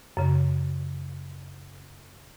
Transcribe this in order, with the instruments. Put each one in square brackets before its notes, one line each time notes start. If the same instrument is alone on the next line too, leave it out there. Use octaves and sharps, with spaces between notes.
[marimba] F#2 C#3